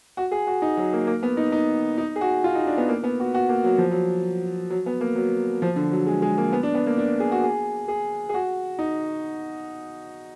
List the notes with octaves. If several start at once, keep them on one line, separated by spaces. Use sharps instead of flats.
F#4
G#4
F#4
D#4
F#3
A#3
A#3
B3
D#4
D#4
D#4
G#4
F#4
F4
D#4
D4
B3
A#3
B3
F#4
F#4
A#3
F#3
F3
F#3
F#3
B3
A#3
F#3
F3
D3
F#3
G#3
G#3
A#3
B3
D4
B3
A#3
D4
G#4
F#4
G#4
G#4
G#4
F#4
D#4